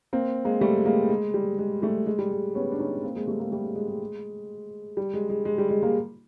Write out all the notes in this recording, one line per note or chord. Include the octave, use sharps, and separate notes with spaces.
A#3 C4
G#3 A#3
G3 A3
G#3 A#3
G#3
G3
G#3
G3 A3
G#3
G3
G#3
B3 C#4
D4
C#4 D#4
A#3 C4
G#3 A#3
G3 A3
G#3 A#3
G3 A3
G#3
G#3
G#3
G3
G#3
G#3
G#3
G3
G#3
G#3 A#3